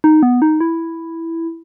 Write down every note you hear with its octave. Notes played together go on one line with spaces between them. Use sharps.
D#4
B3
D#4
E4